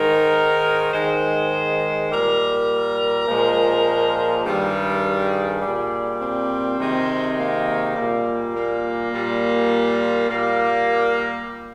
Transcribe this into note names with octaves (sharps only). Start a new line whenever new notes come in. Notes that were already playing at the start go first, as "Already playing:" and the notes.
Already playing: G#2 D#3 G#3 A#4
G#2 D#3 G#3 C5
A#2 G3 A#4
A#2 F3 G#3
G2 D#3 G3 G#4
A#2 G3
C4
C3 D#3 G#3
A#3
A#2 G3
A#3
A#2 G3
A#2 G3 A#3